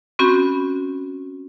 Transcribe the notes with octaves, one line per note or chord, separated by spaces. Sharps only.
C4 C#4 F#4 B5 G6